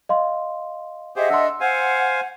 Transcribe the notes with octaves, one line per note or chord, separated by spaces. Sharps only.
D#5 F5 C6
G4 G#4 C5 D#5 E5 F#5
D4 A4 C6 E6
C5 F5 F#5 G#5